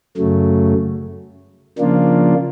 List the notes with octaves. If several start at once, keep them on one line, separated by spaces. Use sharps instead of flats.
F#2 C#3 F#3 A3
C#3 F3 A#3 D4 F4